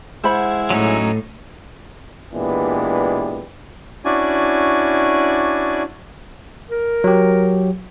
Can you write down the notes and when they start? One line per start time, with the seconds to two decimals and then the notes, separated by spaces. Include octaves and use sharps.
0.24 G#3 E4 C5 F#5 B5
0.70 A2 F#3 C#4 D#4
2.34 A#2 E3 G#3 B3 D4 G4
4.05 C#4 D4 E4 F#4 D5 G#5
6.70 A#4
7.04 F#3 G4